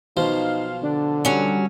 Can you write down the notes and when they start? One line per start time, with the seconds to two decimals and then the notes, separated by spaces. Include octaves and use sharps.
0.17 B1 F3 D#4 C5 F5
0.83 D3 D4
1.25 F#3 G3 C#4